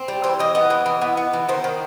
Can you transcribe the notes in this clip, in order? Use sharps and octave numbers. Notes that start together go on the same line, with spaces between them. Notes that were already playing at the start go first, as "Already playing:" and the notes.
Already playing: C4
G3
E3 C5
E3 D#5
B3 D#5
E3
E3
B3
B3
E3
D#3 C5
D#3